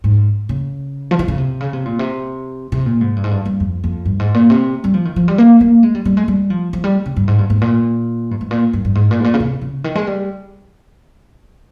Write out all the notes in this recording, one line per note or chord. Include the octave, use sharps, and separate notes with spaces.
G#2
C#3
F3
D#3
C#3
C3
C#3
C3
A#2
C3
C3
A#2
G#2
G2
G#2
G2
G2
F2
F2
G2
G#2
A#2
C3
G3
F3
D#3
F3
G3
A#3
A#3
G#3
G3
G3
G#3
G3
F3
F3
G3
C#3
G2
G#2
G2
G#2
A#2
G2
G#2
A#2
G2
G2
G#2
A#2
G#2
A#2
C#3
C3
C#3
D#3
G#3
G3